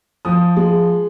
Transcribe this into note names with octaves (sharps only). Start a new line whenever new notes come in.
F3 D#6
G#3